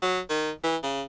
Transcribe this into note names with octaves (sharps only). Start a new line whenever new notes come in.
F#3
D#3
E3
C#3